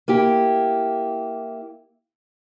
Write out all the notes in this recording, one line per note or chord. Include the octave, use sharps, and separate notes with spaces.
A#3 E4 G4